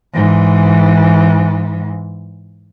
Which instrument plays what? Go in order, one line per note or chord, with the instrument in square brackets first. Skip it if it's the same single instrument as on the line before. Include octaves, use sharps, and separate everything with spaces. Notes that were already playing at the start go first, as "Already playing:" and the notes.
[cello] G#2 E3